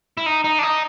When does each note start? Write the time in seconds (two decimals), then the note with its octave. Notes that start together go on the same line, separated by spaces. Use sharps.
0.17 E4
0.26 D#4
0.44 D#4
0.59 D4
0.63 D#4